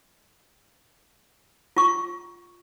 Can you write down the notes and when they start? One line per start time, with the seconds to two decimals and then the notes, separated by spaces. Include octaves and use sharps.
1.77 F4 C#6